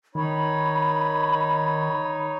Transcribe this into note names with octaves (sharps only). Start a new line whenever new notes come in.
D#3 D#4 C#5 B5